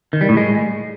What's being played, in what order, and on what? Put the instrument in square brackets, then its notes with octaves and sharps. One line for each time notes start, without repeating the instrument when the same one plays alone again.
[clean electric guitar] D#3
G3
A2
G#3